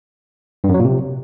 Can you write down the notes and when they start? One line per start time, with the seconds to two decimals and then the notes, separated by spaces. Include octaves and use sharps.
0.64 G2
0.69 F#2
0.74 F#3
0.79 A#2
0.85 C3